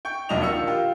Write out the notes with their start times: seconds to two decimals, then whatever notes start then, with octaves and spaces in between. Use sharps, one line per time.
0.05 G5 C#6 G6
0.29 D#1 B1 D4 D#5 F7
0.42 D#3 F4 E6 C#7
0.67 F4 G4